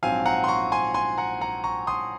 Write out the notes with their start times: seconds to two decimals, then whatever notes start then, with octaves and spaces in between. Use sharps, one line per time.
0.03 A#1 G#2 F#3 C4 F5 G#5
0.26 F#5 A#5
0.44 C6
0.48 A#5 C#6
0.72 G#5 C6
0.94 G#5 C6
1.18 F#5 A#5
1.41 F#5 A#5
1.64 A#5 C#6
1.87 C6 D#6